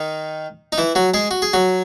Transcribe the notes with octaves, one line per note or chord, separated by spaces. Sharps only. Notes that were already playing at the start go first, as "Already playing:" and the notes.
Already playing: D#3 D#4
D#4
E3 E4
F#3 F#4
G#3 G#4
F#4
G#4
F#3 F#4